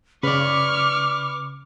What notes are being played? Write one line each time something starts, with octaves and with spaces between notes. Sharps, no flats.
C#3 B4 D5 C#6 D6 F6